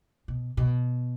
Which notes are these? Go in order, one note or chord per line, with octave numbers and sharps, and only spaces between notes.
B2
B2